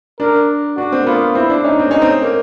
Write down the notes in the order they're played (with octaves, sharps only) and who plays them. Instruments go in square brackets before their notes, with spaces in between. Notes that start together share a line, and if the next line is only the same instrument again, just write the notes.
[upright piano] D4 [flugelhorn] A#4
[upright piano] D4 [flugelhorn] F#4
[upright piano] C4
A#3
[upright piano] B3 [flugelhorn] F4
[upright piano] C4 [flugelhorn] E4
[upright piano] D4
[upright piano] C#4 [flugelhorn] D#4
[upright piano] C4
[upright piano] C#4 [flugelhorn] D#4
[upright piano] C4
A#3